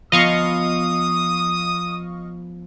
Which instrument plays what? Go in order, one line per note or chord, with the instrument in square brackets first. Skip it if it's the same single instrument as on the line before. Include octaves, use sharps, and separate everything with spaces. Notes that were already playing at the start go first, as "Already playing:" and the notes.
[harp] F3 B3 [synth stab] D#5 F5 C#6 [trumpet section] D#6